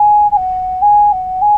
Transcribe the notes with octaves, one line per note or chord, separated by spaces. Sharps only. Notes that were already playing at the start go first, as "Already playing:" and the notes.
Already playing: G#5
G#5
F#5
G#5
F#5
G#5